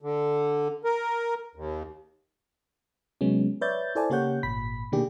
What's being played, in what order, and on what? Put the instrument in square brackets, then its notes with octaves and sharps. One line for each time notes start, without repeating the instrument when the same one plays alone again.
[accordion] D3
A#4
D#2
[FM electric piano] C3 F#3 G#3 B3 C#4
B4 C#5 D5 E5 G6 A6
E4 A4 C5 D5 G#5 A5
C#3 A#3 G4 C#5 F#5 G6
G#1 A#2 B5 B6
B2 D#3 A#3 D4 G4 G#4